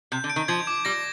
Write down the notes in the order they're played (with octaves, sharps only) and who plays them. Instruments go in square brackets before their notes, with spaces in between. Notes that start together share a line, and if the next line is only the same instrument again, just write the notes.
[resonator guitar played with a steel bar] C3 [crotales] G6
[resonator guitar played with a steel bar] D3
[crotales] D7
[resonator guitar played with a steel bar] D#3
[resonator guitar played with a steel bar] F3 [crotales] G#6
[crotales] D6
[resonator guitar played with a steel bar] G3 [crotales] A#6